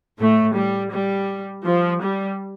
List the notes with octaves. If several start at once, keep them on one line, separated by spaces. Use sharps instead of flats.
A2 A3
G3
G3
F3
G3